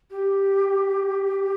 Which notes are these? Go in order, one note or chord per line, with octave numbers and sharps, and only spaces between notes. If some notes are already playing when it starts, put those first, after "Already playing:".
G4